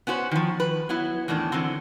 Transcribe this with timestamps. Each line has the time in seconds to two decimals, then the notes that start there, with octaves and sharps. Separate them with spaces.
0.07 B3 C#4 F#4 C5
0.31 D#3 F3
0.60 B4
0.89 F#3 B3 E4
1.28 E2 A2 D#3 D4
1.52 D3 E3 F#3 C4